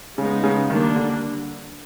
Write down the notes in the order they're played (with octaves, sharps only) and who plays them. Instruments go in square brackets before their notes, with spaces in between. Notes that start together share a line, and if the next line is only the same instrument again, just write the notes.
[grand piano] C#3 [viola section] G#3 B3 D#4
[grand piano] C#3
[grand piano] D#3 [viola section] G3 A#3 D4
[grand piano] D3